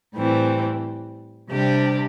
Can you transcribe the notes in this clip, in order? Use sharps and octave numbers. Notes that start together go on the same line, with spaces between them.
A2 E3 G3 C4
C3 G3 D4 G4